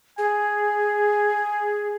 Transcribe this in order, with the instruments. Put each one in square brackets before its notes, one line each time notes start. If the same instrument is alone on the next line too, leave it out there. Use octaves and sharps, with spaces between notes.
[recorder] G#4 [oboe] G#5